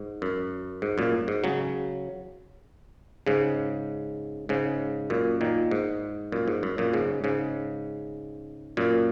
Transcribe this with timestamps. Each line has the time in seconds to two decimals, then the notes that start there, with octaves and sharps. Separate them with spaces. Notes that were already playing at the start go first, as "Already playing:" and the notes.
Already playing: G#2
0.22 F#2
0.82 G#2
0.98 F#2 A#2
1.28 G#2
1.44 C#3 F#3
3.27 G#2 C#3
4.49 G#2 C#3
5.10 F#2 A#2
5.41 A#2 D#3
5.71 G#2
6.32 F#2 A#2
6.48 G#2
6.63 F#2
6.78 F#2 A#2
6.93 G#2 C#3
7.24 G#2 C#3
8.77 F#2 A#2